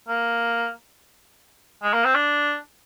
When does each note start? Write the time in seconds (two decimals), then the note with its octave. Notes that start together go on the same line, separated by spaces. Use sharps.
0.08 A#3
1.83 G#3
1.93 A#3
2.04 C4
2.15 D4